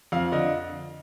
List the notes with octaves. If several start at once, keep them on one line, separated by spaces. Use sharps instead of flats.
F2 F5
D3 D#5